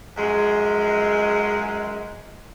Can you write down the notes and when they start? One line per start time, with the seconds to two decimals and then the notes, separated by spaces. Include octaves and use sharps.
0.16 F#2 F3 G#3